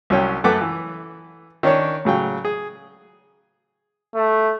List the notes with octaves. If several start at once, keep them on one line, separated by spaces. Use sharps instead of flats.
C2 F#3 C#4 G5
F#2 A3 A4 B4 F#5 D6
E3
D#3 C#4 D4 C#5
A2 C#3 F#3 G5
G#4
A3